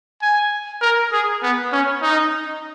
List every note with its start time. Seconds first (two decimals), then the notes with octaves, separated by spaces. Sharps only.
0.22 G#5
0.81 A#4
1.12 G#4
1.42 B3
1.72 C#4
2.02 D#4